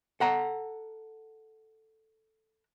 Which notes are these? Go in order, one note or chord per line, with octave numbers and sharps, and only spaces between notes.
A4 F#5 A#5